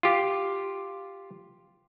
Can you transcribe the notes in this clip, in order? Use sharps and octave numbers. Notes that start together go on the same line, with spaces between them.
F4 G4